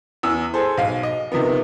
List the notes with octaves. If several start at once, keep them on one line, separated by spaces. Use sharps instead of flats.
E2 E6
G#4 A4 C5
B1 F5
D#5
C3 D#3 F3 B3